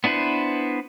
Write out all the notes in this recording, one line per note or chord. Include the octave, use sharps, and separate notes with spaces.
B3 D4 E4 B4 C5